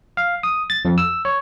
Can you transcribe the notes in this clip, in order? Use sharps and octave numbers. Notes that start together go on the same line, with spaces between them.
F5
D#6
A6
F2
E6
C#5